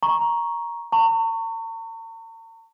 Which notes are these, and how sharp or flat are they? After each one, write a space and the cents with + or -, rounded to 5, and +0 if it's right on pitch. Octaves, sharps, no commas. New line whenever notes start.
A#5 +10 C#6 +0
A#5 -45 C#6 +0